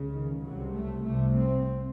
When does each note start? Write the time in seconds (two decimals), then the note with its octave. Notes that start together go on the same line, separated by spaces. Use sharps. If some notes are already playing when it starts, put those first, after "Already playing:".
Already playing: C#2 C#3
0.10 D#3
0.42 C2 C3 F#3
0.74 A3
1.05 C2 C3 A3
1.37 C4